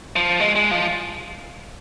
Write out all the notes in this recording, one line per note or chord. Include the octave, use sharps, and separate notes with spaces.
F3
G#3
G#3
F3